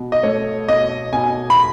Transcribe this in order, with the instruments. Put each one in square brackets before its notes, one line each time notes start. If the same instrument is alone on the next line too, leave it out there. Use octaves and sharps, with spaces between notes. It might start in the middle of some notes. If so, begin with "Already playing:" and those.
Already playing: [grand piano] B2
D#5
A3 C#5
B2 D#5
B2 G#5
B5